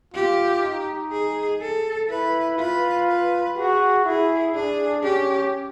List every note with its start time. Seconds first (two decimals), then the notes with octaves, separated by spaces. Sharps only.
0.14 F4 G4
0.63 D#4
1.12 G#4
1.61 A4
2.09 E4 B4
2.59 F4 B4
3.08 B4
3.57 F#4 G#4
4.05 E4 G#4
4.55 D4 G#4
5.03 C#4 G4